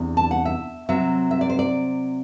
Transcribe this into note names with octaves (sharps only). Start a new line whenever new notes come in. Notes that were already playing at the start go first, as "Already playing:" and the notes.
Already playing: E2 C3 D4
A5
F#5
E5
C3 F#3 C4 E5
E5
D5
C5
D5